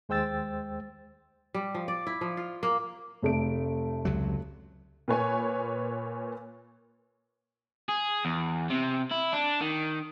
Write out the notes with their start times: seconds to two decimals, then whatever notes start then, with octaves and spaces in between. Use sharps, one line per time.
0.09 D#2 G#3 C5 G5 E6 A6
1.54 G3
1.74 F3
1.88 D5
2.07 E4
2.21 F3
2.37 F4
2.63 A#3
3.22 F1 A3 D7
4.05 C#2 C3 F#3
5.08 A#2 B4 C#5 G#5
7.89 G#4
8.25 E2
8.70 C3
9.11 E4
9.33 D4
9.61 D#3